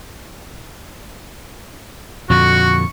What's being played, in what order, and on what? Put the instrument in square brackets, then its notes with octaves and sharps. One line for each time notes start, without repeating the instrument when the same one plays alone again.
[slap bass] F2 A#2 D3 [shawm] F#4 [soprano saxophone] C#6